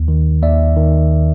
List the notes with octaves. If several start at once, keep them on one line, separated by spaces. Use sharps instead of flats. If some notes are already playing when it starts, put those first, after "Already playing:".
Already playing: D#2
D#3
D#2 D5 E5
D#3